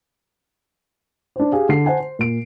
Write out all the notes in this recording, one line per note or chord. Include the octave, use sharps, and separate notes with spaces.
D4 C5
G4 G#4 F5
D3 C7
C5 F#5 G#5 A5
C5
A#2 D7